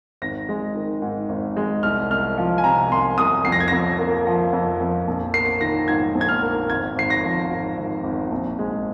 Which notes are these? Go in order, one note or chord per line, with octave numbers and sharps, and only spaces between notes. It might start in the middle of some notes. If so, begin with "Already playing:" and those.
G#1 A#6
G#3
D#3
G#2
G#1
G#3
C2 F6
C2 F6
F3
G#5
C3 A#5
C2 C6
C2 D#6
F2 C7
A#6
G#6
F2 A#6
A#3
F3
F2
F2
A#1
A#3 C7
D#3 A#6
G#2 G#6
A#1
G#6
F6
A#3
G#1 G#6
G#1 C7
A#6
F3
G#2
G#1
G#1
A#1
G#3